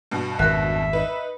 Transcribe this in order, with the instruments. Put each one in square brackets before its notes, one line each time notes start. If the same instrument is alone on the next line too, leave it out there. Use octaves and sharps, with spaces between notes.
[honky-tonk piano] G2 B2
[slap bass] G#1 F2 [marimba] A#4 F#6 [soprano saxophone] E5
[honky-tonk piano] D#4 B4